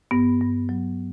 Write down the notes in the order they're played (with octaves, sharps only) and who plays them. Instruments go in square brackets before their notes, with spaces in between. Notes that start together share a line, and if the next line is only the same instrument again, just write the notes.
[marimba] G2 B3
G2
F#3